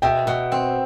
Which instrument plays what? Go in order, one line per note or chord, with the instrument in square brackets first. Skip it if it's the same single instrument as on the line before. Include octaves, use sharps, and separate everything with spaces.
[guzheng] B2 [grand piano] E5 G5
[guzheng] B2
C4